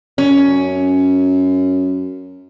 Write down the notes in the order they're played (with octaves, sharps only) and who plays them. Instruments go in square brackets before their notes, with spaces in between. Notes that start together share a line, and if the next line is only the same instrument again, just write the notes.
[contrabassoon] F#2 [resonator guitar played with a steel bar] C#4